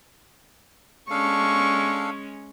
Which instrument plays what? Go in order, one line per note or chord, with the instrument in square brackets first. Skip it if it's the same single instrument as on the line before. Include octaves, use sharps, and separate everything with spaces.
[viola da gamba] G#3 C#4 [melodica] D4 A4 F5 [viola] C#6